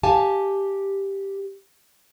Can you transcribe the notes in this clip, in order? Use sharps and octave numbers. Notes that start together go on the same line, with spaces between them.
G4 F5 G#5 A5